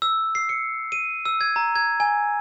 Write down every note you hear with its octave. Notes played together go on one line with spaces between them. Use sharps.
E6
C7
C#7
D#7
E6
G#6
A#5
G#6
G#5